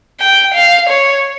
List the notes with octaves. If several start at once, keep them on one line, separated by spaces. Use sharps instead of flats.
G5
F5
C#5